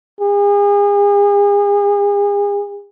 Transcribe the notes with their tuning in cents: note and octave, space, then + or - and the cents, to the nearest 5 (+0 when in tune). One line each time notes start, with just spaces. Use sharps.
G#4 -40